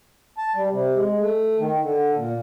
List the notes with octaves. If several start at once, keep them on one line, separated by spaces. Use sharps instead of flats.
A5
G3
C3
G#3
A3
D#3
D3
A#2